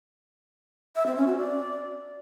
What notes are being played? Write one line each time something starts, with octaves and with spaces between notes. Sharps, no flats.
E5
C4
C#4
F#4
D5